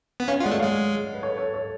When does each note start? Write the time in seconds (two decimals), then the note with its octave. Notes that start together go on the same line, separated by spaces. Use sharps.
0.20 B3
0.28 C#4 C#5 F5
0.40 F4
0.43 G#3 D5 F#5
0.51 A3
0.59 G#3 C#5 F5
1.14 B4
1.23 A4 C#5
1.38 A4 C#5
1.54 A4 C#5